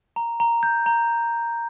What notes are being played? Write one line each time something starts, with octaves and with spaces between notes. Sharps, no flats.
A#5
A#5
G6
A#5